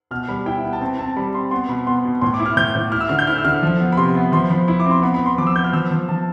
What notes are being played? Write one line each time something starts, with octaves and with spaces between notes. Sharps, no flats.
B2 F6
G3 B5
E4 G5
B3
A5
C4 G5
C4 A5
G3 B5
C4 C6
B3 C6
B2 B5
B3 C6
B2
A2 C6
D6
E4
F6
A2 G6
A2
E4 F6
E6
D3 F6
G6
E4 F6
E6
D3 F6
F3
B3
B5
C3 C6
B3
F3 C6
F3 B5
E4 B5
D6
C4
C6
B3 B5
B5
B3
C6
F3 D6
E6
B3 G6
F6
F3 E6
F3
F3 A5